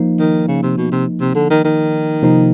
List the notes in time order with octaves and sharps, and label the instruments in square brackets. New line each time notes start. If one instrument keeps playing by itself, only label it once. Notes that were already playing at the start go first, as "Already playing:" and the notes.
Already playing: [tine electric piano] F3 A#3 D#4
[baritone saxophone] D#3
C#3
C3
B2
C3
C3
D3
D#3
D#3
[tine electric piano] C3 F3 A#3 D#4